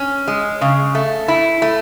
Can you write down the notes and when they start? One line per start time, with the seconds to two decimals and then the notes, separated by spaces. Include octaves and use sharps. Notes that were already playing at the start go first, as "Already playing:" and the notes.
Already playing: C#4
0.28 G#3
0.61 C#3
0.95 A3
1.28 E4
1.62 A3